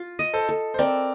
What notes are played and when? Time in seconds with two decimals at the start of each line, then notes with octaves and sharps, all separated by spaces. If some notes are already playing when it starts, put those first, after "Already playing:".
Already playing: F4
0.19 D#5
0.33 A4 C5
0.49 A4
0.74 C5
0.78 C4 A#4 D5